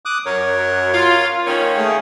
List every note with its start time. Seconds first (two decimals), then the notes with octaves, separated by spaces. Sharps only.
0.05 D6 D#6 F#6
0.26 F#2 A#4 C#5
0.92 F4
1.47 D#3 A#3 C#4
1.77 A3 G#4